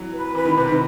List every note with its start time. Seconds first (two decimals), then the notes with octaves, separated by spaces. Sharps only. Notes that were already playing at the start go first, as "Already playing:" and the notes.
Already playing: E3 F#3
0.14 B4
0.35 E3 B4
0.45 D#3
0.55 C3 B4
0.69 D#3